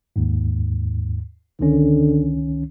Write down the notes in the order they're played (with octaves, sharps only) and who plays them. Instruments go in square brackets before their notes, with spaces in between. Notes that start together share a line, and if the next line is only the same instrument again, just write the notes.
[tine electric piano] D#2 G#2
[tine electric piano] C#2 D#3 C#4 [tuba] D3